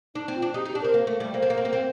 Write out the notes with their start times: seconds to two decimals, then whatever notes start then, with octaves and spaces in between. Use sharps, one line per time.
0.15 D4 D#4
0.28 C4
0.35 F4
0.42 D4
0.54 D#4 G4
0.65 D#4
0.68 G4
0.75 D4
0.82 C4 A#4
0.94 A#3
1.07 A3
1.20 G3
1.34 A#3 C5
1.42 C4
1.50 A#3
1.58 C4
1.65 A#3
1.73 C4